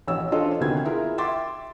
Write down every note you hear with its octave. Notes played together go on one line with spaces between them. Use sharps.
E1 A1 C#5 E6
C#4 D4 F4 A4 C5 D#5
D2 C3 D#3 B3 G#6
E4 F4 G#4 A#4
E5 G5 C6 D6 A6